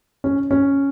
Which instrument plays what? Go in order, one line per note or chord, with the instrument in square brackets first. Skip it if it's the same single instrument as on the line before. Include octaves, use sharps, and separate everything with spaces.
[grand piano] C#4
C#4